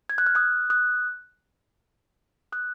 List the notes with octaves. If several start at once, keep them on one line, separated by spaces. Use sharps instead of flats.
G#6
F#6
F6
D#6 F#6
D#6 F#6
D#6 F#6